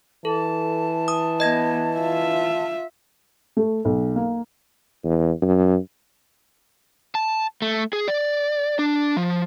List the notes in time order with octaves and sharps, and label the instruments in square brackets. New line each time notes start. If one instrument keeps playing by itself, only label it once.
[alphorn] E3 [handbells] A4 [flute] A5
[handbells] D#6
[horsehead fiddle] B3 [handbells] D#5 G#6 A#6
[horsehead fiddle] F4 E5
[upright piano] A3
B1
A#3
[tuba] E2
F#2
[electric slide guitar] A5
A3
G#4
D5
D4
F3